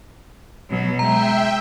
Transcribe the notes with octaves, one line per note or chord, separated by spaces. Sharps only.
B2 F#3
G#3 E5 G5 A#5